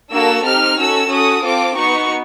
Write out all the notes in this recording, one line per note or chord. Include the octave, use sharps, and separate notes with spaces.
A#3 D4 F#4 A4 E6
C4 D#4 G4 F6
C#4 F#4 A4 E6
C#4 F#4 A4 D#6
C4 F4 A4 D6
B3 D#4 F#4 C#6